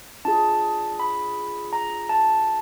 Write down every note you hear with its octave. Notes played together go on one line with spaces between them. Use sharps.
D4 F4 G#4 A5
B5
A#5
A5